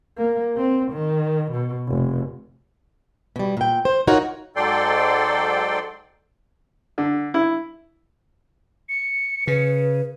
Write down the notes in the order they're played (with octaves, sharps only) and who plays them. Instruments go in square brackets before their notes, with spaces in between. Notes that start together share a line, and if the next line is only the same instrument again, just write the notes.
[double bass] A#3
C4
D#3
B2
F1
[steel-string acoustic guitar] B2 G3
A#2 G5
C5
D#4 F4 F#4 A#4 C#5
[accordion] G#2 F#3 A4 D5 G5 C6
[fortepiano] D3
E4
[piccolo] C#7
[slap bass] C#3 [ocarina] B4